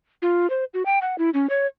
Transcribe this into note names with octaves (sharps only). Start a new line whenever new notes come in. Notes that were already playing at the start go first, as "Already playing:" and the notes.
F4
C5
F#4
G5
F#5
E4
C#4
C#5